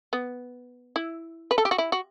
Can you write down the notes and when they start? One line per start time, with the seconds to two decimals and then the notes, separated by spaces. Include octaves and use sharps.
0.13 B3
0.96 E4
1.51 B4
1.58 A4
1.65 G4
1.71 F#4
1.78 E4
1.92 F#4